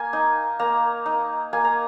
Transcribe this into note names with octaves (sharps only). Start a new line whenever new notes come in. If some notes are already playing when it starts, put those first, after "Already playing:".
Already playing: A#3 G#5
D#4
A#3 A#5
D#4
A#3 G#5
A#5